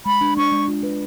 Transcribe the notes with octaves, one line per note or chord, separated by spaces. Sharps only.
G#3 B5
D4
D4 C#6
G#3
F4
B4